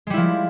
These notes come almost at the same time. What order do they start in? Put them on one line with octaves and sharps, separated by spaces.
G#3 G3 E4 F3